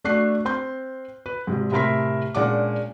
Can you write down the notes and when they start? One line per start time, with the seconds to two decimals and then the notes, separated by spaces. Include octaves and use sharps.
0.04 A3 D4 F#4 F#6 C7
0.45 C4 C6 G6
1.26 B4
1.47 G#2 C3 G3
1.72 A2 C3 A#4 E5 C6 B6
2.35 A#2 G#3 C#4 D4 F#5 D6